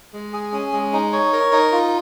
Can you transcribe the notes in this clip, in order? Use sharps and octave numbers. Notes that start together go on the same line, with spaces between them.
G#3
G#4
C#4
G#3
D#4
C#5
A#4
D#4
F4